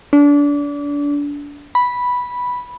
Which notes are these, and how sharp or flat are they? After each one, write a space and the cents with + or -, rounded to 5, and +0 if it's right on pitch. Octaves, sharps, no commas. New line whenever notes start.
D4 -30
B5 -5